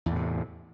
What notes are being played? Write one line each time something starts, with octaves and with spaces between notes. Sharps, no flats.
E2 A2 C3